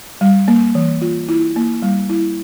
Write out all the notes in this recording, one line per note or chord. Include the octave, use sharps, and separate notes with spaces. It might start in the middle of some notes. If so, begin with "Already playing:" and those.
G3
A#3
E3
F4
E4
A#3
G3
E4